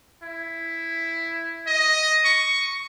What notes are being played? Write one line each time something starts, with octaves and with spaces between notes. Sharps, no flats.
E4
D#5
C#6